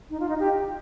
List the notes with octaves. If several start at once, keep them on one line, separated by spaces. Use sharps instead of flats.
D#4
F4
D#4
G4